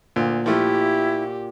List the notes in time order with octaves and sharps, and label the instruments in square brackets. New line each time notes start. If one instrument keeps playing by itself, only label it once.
[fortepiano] D2 [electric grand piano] A#2
[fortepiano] F3 A3 [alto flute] E4 [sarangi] G4